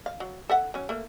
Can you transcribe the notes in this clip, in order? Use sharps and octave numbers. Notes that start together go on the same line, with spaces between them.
F5
F#3
A4 E5 F#5
F#3 C#4
A3 A#3